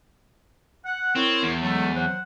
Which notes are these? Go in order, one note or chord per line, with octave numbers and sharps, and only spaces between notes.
F#5
C4 E4 A#4 C#5
E2
F#3 G#3 A3
F#3 C5 F#5